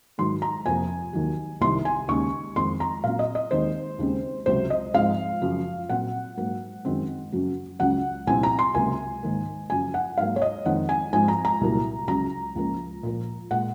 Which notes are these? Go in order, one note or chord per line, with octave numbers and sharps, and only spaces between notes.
G#2 D#3 F#3 C6
A#5
F2 C3 F3 A#3 G#5
D#2 D#3 F#3
C2 C3 D#3 C6
G#5
D#2 C#3 G#3 C#6
F2 D#3 G#3 C4 C6
A#5
A#2 F#3 C4 F5
D#5
D#5
D#2 D#3 G#3 C4 C5
D#2 C#3 G#3 C4
C#2 C3 F#3 C5
D#5
G#2 F3 G#3 C4 F5
F#2 C#3 F3
A#2 F#3 C4 F#5
G#2 F#3 A#3
F#2 D#3 G#3 C4
F#2 C#3 F#3
C#2 C#3 F#3 F#5
C2 A#2 F3 C4 G#5
A#5
C6
C#2 C3 F#3 A#3 G#5
G#2 D#3 A#3
F#2 C#3 F3 G#5
F#5
G#2 F#3 A#3 F5
C#5
D#5
F2 D#3 G#3 C4 F#5
G#5
G#2 F3 G#3 C4 G#5
A#5
A#5
C2 A#2 F#3 A#3
C#2 C#3 F#3 A#5
C#2 C#3 F3 A#3
A#2 F3 A#3
A#2 G#3 F#5